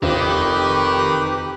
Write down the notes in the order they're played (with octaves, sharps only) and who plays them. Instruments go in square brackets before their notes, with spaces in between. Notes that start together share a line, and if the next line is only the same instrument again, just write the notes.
[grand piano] F1 C4 F4 [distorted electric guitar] D#3 [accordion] G4 [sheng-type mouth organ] B4